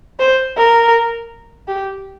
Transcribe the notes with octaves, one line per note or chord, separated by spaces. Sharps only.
C5
A#4
G4